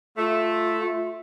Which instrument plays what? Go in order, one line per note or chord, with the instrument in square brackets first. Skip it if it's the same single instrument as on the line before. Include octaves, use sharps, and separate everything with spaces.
[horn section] A3 [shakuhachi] F4